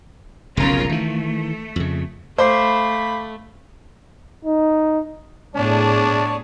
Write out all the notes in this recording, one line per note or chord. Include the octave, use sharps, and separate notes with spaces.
F1 B1 C#3 F4 A#4
D#3 E3 A3
F2 C#3
A3 C5 F5 B5 D6 C7
D#4
A2 B3 D4 G#4 C#5 D5 A5